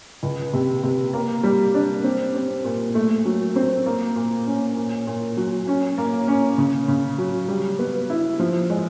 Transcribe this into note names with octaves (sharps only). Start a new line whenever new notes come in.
C#2
C3
C3
A#3
G3
D4
C4
C4
A#2
A3
F#3
C4
A#3
A#2
C#4
A#2
A#2
F#3
C#4
A#3
C#4
C#3
C#3
F#3
G3
B3
E4
F3
G#3